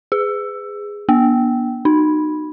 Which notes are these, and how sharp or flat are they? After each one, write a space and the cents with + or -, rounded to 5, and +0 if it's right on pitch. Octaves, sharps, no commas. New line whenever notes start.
G#4 -10
B3 -45
D#4 -30